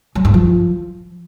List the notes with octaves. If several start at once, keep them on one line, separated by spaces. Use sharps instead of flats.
F#3
G2
F3